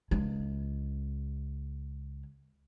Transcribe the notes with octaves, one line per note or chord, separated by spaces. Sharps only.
C#2 G#3